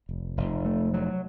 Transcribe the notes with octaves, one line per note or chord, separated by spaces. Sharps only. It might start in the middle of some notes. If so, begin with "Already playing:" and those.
F1
F1
A3
F#3